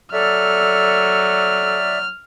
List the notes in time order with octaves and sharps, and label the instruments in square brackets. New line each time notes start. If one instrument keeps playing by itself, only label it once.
[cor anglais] F#3 [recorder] A4 [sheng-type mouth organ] D5 E5 [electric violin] F6